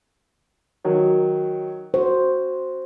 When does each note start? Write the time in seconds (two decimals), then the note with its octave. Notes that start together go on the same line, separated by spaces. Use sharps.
0.84 D#3 F#3 C#5
1.94 F#4 C5